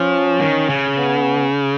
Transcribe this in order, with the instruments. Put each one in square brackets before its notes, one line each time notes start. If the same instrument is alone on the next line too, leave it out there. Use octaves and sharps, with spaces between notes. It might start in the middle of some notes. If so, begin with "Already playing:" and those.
Already playing: [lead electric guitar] F3 [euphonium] C#4
[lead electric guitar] D#3
C#3
[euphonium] B3